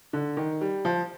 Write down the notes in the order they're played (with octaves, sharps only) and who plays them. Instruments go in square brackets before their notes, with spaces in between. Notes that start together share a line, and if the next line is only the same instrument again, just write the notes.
[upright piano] D3
D#3
G3
F3